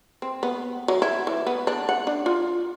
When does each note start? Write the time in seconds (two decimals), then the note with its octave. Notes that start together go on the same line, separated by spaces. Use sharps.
0.22 C4
0.43 B3
0.88 F#3
1.02 E4
1.27 E3
1.47 B3
1.67 D4
1.89 F#5
2.07 D4
2.26 F4